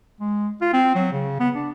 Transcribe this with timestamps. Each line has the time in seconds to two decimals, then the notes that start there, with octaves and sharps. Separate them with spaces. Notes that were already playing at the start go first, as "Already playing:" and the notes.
0.20 G#3
0.61 F4
0.73 C4
0.95 F#3
1.12 C#3
1.40 B3
1.55 D4